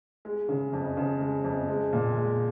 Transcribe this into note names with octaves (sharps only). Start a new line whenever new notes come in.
G#3
C#3
F2
C#3
G#3
F2
G#3
A#2
G#3